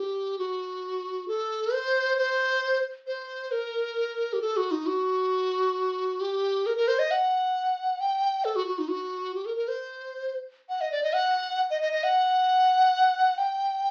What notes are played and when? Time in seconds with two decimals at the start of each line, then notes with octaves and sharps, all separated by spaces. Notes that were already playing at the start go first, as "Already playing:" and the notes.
Already playing: G4
0.39 F#4
1.28 A4
1.73 C5
2.18 C5
3.07 C5
3.51 A#4
4.33 G4
4.42 A4
4.57 F#4
4.71 D#4
4.86 F#4
6.21 G4
6.66 A#4
6.77 A#4
6.88 C5
6.99 D#5
7.11 F#5
8.00 G5
8.45 A4
8.56 F#4
8.67 F#4
8.79 D#4
8.90 F#4
9.35 G4
9.46 A#4
9.57 A#4
9.68 C5
10.69 F#5
10.81 D#5
10.92 D5
11.03 D#5
11.14 F#5
11.70 D#5
11.82 D#5
11.93 D#5
12.04 F#5
13.38 G5